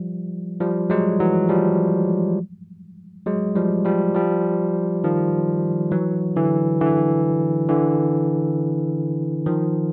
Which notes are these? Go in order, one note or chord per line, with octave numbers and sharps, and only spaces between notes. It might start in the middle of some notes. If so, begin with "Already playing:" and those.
Already playing: F3 G3
F3 G3
F#3 G#3
E3 F#3
F3 G3
F#3 G#3
F3 G3
F3 G3
F3 G3
D#3 F3
E3 F#3
D3 E3
D3 E3
D3 E3
D#3 F3